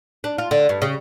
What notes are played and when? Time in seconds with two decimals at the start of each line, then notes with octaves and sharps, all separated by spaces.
0.24 D4
0.38 F4
0.51 D3
0.69 G2
0.82 C#3